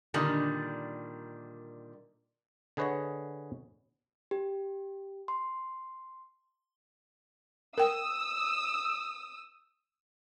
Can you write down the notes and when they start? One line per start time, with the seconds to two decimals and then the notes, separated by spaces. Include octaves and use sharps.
0.14 A#2 D3 D#3 G3
2.77 D3 G#4 B4 C#5 D#5 F#5
4.31 G4
5.28 C6
7.78 A#4 G5 D#6 E6